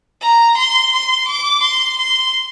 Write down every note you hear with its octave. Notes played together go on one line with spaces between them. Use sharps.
A#5
C6
C6
D6
C6
C6